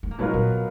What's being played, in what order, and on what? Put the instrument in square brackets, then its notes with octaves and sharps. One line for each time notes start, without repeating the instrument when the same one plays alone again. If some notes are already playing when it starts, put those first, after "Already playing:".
[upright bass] B3
A#3
[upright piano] B2 F#3 B3 F4 A#4 [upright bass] G#3
[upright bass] A#2